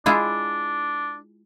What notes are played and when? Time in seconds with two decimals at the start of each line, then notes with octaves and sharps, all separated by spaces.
0.06 G#3 D4 E4 F4